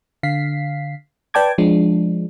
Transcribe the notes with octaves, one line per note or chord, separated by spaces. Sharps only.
D3 F5 B6 C7
B4 D5 G5 A5 D6 G#6
F3 G#3 D4